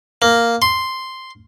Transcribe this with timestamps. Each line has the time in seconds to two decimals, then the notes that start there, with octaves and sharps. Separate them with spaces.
0.22 A#3
0.62 C6